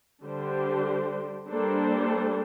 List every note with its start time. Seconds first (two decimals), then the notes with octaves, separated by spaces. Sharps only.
0.24 D3 G3 D4 G4 C5
1.49 G3 A#3 D4 A4 C5